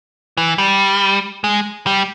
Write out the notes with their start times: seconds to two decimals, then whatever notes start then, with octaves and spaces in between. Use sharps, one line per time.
0.37 E3
0.58 G3
1.44 G#3
1.87 G3